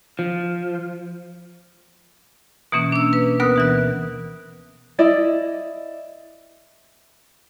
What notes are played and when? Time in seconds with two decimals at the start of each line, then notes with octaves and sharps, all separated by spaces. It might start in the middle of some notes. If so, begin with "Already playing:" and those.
0.19 F3
2.72 B2 E3 A#3 C#4
2.92 D4 E6
3.13 B4
3.40 D2 B3 A#4 B4 D#6 F#6
3.56 B2 E3 F#6
4.99 E4 D5 D#5